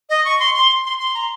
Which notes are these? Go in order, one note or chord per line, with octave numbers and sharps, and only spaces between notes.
D#5
C#6
C6
C6
C6
C6
A#5